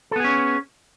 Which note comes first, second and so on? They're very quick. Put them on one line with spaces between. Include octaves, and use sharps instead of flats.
A4 B3 G#4 C#4